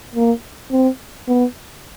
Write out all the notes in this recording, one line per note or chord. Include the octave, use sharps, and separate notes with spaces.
A#3
C4
B3